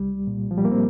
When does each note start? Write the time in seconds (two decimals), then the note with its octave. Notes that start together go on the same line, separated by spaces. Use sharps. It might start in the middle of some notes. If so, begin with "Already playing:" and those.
Already playing: C2 G3
0.27 A#2
0.51 F3
0.58 G3
0.65 A#3
0.71 C4